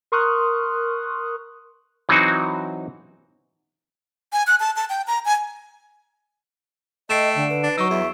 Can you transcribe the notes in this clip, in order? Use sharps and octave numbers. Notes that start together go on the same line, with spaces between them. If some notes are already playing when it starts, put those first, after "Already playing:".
A#4 C6 C#6 D#6 F6 F#6
E3 F#3 C4 D#4 F#4
G#5
F#6
A5
A5
G5
A#5
G#5
A3 D#5 G5 C7 D7 E7
D3
B4
D4
F#3 D#4 C#6 E6
E2 E5